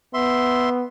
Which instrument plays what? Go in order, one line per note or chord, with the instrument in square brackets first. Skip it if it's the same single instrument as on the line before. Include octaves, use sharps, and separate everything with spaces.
[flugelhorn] B3 [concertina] E5 C6